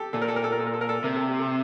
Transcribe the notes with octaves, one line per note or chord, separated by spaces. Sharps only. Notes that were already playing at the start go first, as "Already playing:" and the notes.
Already playing: G4 A4
A#2 A4
A#4
A4
A#4
A4
A#4
A4
A#4
A4
A#4
A4
C3 A#4
A4
G4
A4